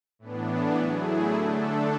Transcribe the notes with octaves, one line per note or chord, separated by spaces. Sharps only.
A2 E3 B3 D4
F#3 A3 E4 G#4
D3 A3 D4 A4